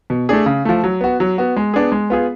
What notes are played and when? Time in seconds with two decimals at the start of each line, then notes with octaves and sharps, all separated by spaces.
0.10 B2
0.29 A3 D4 G#4
0.46 C#3
0.65 F3 A3
0.84 F#3
1.01 B3 F#4
1.20 F#3
1.38 B3 F#4
1.57 G#3
1.74 B3 D4 G#4
1.92 G#3
2.10 B3 F4 G#4